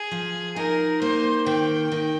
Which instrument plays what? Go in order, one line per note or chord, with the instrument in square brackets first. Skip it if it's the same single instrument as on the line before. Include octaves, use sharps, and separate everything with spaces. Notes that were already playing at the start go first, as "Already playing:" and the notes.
Already playing: [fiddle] G#4
[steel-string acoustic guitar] F3
[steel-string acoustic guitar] D#4 [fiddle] A#4
[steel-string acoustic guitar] A#3 [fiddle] C5
[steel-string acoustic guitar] D#3 [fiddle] G5
[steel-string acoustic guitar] D#3